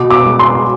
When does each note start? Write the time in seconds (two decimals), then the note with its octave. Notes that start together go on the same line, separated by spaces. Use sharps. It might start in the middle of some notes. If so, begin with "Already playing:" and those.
Already playing: B2 D6
0.10 D6
0.25 G#3
0.39 C6